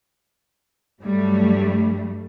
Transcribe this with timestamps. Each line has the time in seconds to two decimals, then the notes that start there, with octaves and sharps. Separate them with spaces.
1.00 G2 F#3 G3 A3